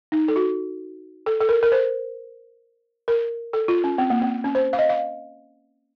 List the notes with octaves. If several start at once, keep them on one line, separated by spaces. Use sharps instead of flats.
D#4
A4
F#4
A4
A4
A#4
A#4
C5
A#4
A4
F4
C#4
C4
A#3
C4
C#4
C5
F5
D#5
F5